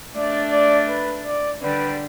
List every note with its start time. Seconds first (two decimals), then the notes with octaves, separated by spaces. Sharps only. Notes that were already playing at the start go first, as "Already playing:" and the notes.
0.15 A3 D4 D5
0.52 D5
0.88 B4
1.26 D5
1.62 D3 G3 B4